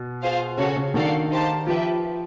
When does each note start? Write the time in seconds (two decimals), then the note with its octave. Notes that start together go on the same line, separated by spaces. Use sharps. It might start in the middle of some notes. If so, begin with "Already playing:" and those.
Already playing: B2
0.21 F4 G#4 C5 F5
0.57 C#3 C#4 F#4 A4 C#5
0.76 C#3
0.94 D#3 D4 F#4 A4 D5 F5
1.31 D#4 G4 C5 F5 A5
1.67 F3 G4 B4 E5